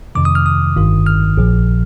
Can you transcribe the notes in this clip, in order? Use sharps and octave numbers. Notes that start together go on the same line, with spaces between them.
F2 C3 D#3 D6
D#6
F6
D#6
G1 G2 D#3
F6
A#1 A#2 F3